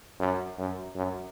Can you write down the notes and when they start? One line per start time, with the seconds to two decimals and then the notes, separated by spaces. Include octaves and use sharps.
0.20 F#2
0.58 F#2
0.96 F#2